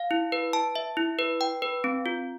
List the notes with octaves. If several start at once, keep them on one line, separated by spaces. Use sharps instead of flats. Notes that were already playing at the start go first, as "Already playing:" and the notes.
Already playing: F5
E4
B4
A5
E5
E4
B4
G5
B4
C4
F4